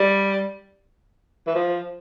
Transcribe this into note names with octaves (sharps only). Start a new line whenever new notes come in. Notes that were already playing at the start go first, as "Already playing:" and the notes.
Already playing: G3
E3
F3